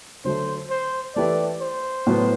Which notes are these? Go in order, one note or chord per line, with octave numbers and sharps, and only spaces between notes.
D3 F#3 A3 C5
C5
E3 A3 E4 G4 B4 D5
C5
A2 F#3 B3